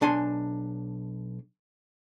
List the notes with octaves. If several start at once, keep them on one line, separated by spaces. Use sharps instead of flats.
B1 D4 G#5 C6